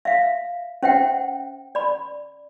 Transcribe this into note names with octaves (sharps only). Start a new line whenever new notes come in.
E5 F5
C#4 C5 E5 F#5 G5
D5 B5